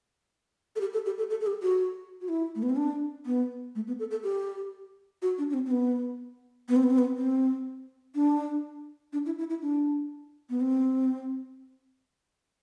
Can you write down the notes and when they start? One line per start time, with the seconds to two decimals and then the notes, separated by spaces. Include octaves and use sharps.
0.76 A4
0.81 G4
0.93 A4
1.06 G4
1.18 A4
1.30 A4
1.41 A4
1.47 G4
1.62 F#4
2.21 F#4
2.29 E4
2.55 A3
2.63 B3
2.69 C4
2.76 D4
3.26 B3
3.75 A3
3.87 B3
3.99 A4
4.11 A4
4.24 G4
5.22 F#4
5.38 D4
5.50 D4
5.54 C4
5.66 C4
5.71 B3
6.69 B3
6.76 C4
6.83 B3
6.90 C4
6.98 B3
7.17 C4
8.15 D4
9.13 D4
9.26 E4
9.38 E4
9.50 E4
9.62 D4
10.50 B3
10.61 C4